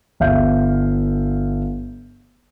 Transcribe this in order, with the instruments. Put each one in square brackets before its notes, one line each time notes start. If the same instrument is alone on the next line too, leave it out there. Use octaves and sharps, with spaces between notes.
[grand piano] G1 E5 F5 G6